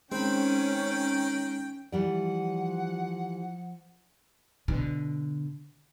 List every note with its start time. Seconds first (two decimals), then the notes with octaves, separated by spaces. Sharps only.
0.12 D#3 G#3 C4 C#4 G5 B5
1.92 E3 F3 G3 D5 F#5
4.68 B2 D3